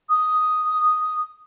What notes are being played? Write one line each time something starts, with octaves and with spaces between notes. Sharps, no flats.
D#6